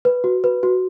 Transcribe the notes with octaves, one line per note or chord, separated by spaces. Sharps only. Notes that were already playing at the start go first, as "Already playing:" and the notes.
B4
F#4
B4
F#4